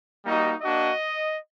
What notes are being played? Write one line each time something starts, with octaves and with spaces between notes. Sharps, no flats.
G3 A#3 D#4 F#4
A#3 D4 F#4 D#5